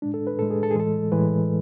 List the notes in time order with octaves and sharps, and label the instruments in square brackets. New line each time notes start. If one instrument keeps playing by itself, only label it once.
[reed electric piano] A2 G#3 D4
A4
B4
A2 G#3 A4
G#4
A4
G#4
A2 E3 G#3 A4
A2 E3 G#3 B4